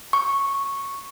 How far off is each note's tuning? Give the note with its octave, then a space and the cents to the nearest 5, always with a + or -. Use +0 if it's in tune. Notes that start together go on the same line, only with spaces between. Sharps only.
C#6 -5